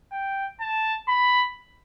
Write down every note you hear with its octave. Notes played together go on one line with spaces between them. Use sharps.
G5
A5
B5